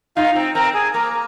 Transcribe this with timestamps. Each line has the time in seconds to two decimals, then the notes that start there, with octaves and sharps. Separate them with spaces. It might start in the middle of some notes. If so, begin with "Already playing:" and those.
0.16 D#4 F4 F5
0.36 C4
0.55 C4 A#4 A#5
0.74 G#4 G#5
0.94 A#3 A#4 A#5